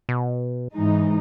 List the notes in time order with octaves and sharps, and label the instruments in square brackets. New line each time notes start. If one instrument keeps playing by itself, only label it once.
[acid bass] B2
[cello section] G#2 E3 G#3 D#4